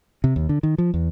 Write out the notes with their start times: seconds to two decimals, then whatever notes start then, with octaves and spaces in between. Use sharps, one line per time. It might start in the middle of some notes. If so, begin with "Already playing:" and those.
0.24 C3
0.36 D#2
0.49 D3
0.63 D#3
0.78 F3
0.94 E2